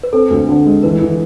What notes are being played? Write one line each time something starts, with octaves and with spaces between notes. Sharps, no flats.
B4
C4 A4
D2
D3
G#3
E3 B4
E3